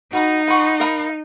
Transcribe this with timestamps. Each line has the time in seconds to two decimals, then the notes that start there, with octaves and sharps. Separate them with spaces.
0.13 D#4 F#4 B4 F5 A#5
0.47 F4 B4 F#5 C#6
0.80 A#4 F5 B5 D#6